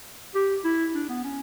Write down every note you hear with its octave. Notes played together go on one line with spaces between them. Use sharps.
G4
E4
D4
B3
C#4